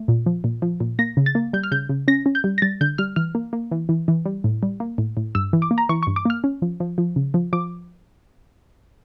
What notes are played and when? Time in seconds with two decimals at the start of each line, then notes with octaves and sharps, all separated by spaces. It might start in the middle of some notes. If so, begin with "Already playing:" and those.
Already playing: A3
0.08 A#2
0.26 F3
0.44 A#2
0.62 F3
0.80 A#2
0.99 A#3 A#6
1.17 C#3
1.26 A6
1.35 A#3
1.53 G3 G6
1.63 F6
1.72 C#3 G6
1.89 C#3
2.08 C#4 A#6
2.26 C#4
2.35 G6
2.44 G3
2.58 A#6
2.62 G3 A6
2.81 D3 G6
2.98 G3 F6
3.16 E3 F6
3.35 A#3
3.53 A#3
3.71 E3
3.89 E3
4.08 E3
4.26 G3
4.44 A2
4.63 G3
4.80 A#3
4.98 A2
5.17 A2
5.35 G2 E6
5.53 E3
5.62 D6
5.71 A#3
5.78 A#5
5.89 E3 C#6
6.03 C#6
6.07 G2
6.16 D6
6.25 A#3 F6
6.44 C#4
6.62 F3
6.80 F3
6.98 F3
7.16 C#3
7.34 F3
7.53 F3 D6